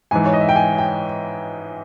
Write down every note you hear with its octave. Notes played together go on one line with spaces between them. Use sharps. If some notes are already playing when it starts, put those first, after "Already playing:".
G#2 E3 G#5
C#5
D#5
E5
G5
G#5
G5